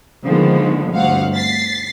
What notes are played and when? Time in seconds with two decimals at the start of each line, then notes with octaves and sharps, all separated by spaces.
0.25 D3 D#3 F3 G#3 A#3 B3
0.93 G1 D2 C4 F5 F#5
1.34 A6 B6 C7